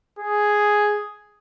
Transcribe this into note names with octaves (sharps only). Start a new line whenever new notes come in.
G#4